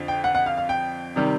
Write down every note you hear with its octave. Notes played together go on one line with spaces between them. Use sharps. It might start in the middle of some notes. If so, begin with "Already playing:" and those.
Already playing: F2 D3 F3
G5
F#5
F#5
F5
F5
G5
C3 D#3 G3